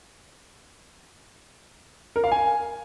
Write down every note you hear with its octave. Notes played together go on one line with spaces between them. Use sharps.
A#4
F5
G#5